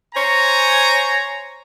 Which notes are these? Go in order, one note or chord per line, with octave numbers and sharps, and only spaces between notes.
C5 C#5 G#5 A#5